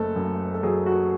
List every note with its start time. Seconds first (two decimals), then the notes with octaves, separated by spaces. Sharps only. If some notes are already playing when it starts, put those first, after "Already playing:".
Already playing: F#1 A3 A4
0.16 F#2
0.54 A4
0.63 F#3 G#4
0.86 F#4